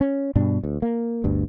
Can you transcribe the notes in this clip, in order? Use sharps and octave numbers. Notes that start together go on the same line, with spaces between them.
C#4
G2 B2 D4
D2
A#3
G1 D2 G2